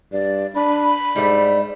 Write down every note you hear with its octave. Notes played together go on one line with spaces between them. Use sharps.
G2 D5
D4 B5
G#2 G3 A3